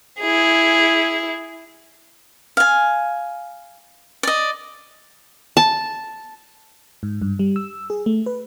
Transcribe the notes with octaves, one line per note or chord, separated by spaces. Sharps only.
E4 G#4
F5 G#5
D5 D#5
A5
G#2
G2
G3
E6
G#4
A3
B4